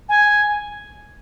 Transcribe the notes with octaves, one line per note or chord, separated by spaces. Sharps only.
G#5